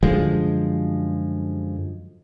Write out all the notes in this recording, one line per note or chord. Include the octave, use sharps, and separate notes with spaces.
F#2 D3 F3 G#3